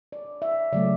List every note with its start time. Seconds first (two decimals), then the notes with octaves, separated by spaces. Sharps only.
0.12 D5
0.42 E5
0.72 C#3 F#3 A3 D5